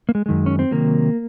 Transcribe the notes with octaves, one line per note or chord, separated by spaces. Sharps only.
A#3
G#3
F#2 D#3 G#3
C#4
C4
C3 D#3 F#3 A#3